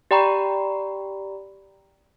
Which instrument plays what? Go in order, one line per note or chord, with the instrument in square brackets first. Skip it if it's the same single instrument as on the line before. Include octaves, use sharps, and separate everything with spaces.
[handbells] G4 D5 G5 A#5 B5 C#6